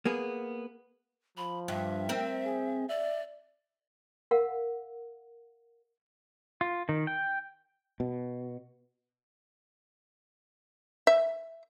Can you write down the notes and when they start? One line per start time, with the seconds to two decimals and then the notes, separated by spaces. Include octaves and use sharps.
0.05 A#3 B3 G#4
1.37 F3 B5
1.68 G2 E5
2.09 C4 A#4
2.45 G#4
2.89 D5 E5
4.31 A#4 F5 F#5
6.61 F4
6.89 D#3
7.07 G5
8.00 B2
11.07 E5